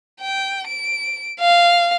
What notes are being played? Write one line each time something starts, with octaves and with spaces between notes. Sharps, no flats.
G5
D7
F5